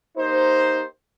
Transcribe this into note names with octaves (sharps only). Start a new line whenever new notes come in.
A#3 D#4 G4 C5